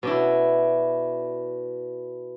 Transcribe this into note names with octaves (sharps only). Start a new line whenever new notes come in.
B2 D4 E4